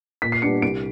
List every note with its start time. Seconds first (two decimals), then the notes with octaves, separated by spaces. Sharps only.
0.22 A#2 B6
0.32 C7
0.42 G3 B3 D4 C#7
0.62 C2 D7